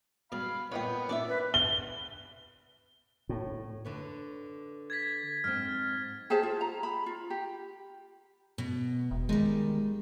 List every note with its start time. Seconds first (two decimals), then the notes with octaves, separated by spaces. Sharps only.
0.32 B2 G3 F5 B5 D#6
0.72 C2 A#2 B3 B4 C#5 D#5 G5
1.09 A#2 C#4 D4 D5 E5
1.27 B4
1.54 G7
3.29 A2
3.85 D3 B4 C#5
4.90 G#6 A6 B6
5.44 G#2 C4 F6
6.30 G4 G#4 C5 A5
6.43 F4
6.61 A#5
6.83 B5
7.06 F4
7.30 G4
8.58 B2
9.11 E1
9.29 D#3 G3 G#3